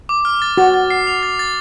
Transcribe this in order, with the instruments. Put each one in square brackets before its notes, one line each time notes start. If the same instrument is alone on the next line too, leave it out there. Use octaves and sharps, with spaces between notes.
[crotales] D6
F6
A6
[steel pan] F#4 [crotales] A6
[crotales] A6
C7
F7
A6
A6